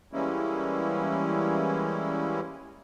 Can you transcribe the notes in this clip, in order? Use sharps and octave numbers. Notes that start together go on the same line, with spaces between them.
E3 G3 G#3 A#3 C#4 E4